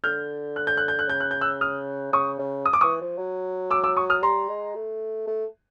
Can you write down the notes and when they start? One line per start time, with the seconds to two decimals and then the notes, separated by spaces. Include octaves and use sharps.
0.04 D3 F6 G6
0.56 F#6
0.67 G6
0.77 F#6
0.88 G6
0.99 F#6
1.08 C#3 G6
1.20 F#6
1.31 G6
1.41 E6 F#6
1.61 D#6 F6
2.13 C#3 C#6 D#6
2.39 C#3
2.66 D#6
2.73 D6
2.81 E3 C#6 D#6
3.01 F3
3.18 F#3
3.70 D6 E6
3.84 D6 E6
3.97 C#6 D#6
4.10 D#6 F6
4.23 G3 A#5 C6
4.49 G#3
4.75 A3
5.27 A3